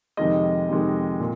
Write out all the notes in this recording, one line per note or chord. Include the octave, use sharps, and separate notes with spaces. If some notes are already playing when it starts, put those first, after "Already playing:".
F2 C3 D#3 G#3 D#5
F2 C3 D#3 G#3
A#2